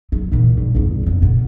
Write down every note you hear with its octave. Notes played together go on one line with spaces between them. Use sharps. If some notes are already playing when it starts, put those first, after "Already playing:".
F#3
A#2 E3
G2
E2 G2
F2
A#2 B3